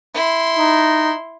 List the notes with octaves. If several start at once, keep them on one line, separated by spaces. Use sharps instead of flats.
E4 C6
D#4